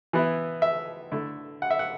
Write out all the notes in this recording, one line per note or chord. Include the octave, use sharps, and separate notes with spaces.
E3 B3 E4
E5
D3 A3 E4
F#5
E5
F#5